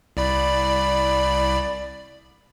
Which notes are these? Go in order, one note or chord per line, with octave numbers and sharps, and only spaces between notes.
C2 D5 B5